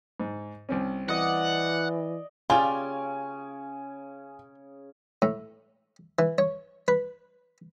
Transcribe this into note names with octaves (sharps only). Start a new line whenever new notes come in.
G#2
C2 C4 C#4
E3 D5 D#5 F#5
C#3 F4 G4 D5 G#5
A2
E3
C#5
B4